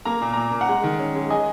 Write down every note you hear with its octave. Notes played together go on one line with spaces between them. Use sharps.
A#3 A#5
A#2
A#2 A#5
A#2
F#5 A#5
G#3
D#3
C#4
G#3
G#3 D#5 G#5